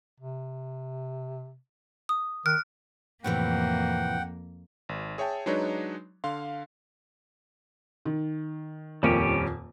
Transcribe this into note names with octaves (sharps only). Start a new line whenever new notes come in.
C3
D#6
D#3 F6 F#6
F2 A2 C3 E3 A#3 F#5 G5
G#1
G#4 C#5 E5 G5 A5
F#3 G#3 D4 D#4 B4 C#5
D3 F5 C6
D#3
D#1 F2 G3 A#3 C#4 G4